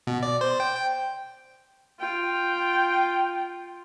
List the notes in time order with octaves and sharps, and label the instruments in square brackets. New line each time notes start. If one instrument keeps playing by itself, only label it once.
[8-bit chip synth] B2
D5
C5
G5
G5
[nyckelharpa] F4 [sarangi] G5